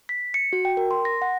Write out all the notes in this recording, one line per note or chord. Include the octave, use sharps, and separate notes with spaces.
B6
C#7
F#4
G5
A#4
C6
A#6
F#5